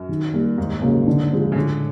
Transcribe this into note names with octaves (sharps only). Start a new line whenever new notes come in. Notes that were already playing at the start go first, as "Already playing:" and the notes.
Already playing: F#2
D#3
G3 A#3
D#2 G#2
C#3 F#3 A#3
D3
F3 G#3 C4
C#3
A2 D3